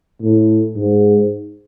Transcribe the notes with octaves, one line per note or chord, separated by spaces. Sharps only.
A2
G#2